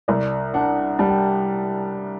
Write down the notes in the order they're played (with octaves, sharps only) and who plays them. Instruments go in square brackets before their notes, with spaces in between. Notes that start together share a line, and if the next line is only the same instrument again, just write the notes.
[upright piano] C2 [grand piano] D5
[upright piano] D4 [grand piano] F#5
[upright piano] G3 [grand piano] A5
[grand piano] G5